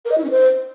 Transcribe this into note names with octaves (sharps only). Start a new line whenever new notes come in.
A#4
D#5
E4
C#4
C5